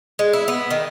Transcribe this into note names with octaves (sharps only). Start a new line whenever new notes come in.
G#3
E4
B3
D#3